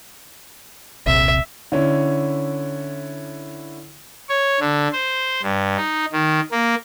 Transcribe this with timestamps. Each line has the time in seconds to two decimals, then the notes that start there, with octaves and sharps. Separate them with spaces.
1.06 D#1 A#1 C3 E5
1.72 D3 C#4 E4
4.29 C#5
4.60 D3
4.93 C5
5.42 G2
5.77 D#4
6.13 D#3
6.52 A#3